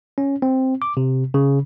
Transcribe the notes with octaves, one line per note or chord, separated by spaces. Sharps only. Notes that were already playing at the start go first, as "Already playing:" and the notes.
C#4
C4
D6
C3
C#3